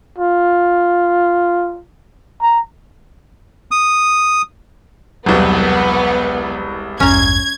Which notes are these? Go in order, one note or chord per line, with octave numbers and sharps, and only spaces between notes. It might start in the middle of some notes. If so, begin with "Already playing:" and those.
F4
A#5
D#6
E1 C2 F#3 B3
A1 E2 G2 C#4 A#5 G#6